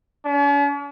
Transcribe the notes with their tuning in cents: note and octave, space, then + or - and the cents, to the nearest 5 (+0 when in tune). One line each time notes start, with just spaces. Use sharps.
C#4 +45